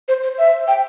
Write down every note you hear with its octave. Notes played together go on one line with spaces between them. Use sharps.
C5
C5
E5
G5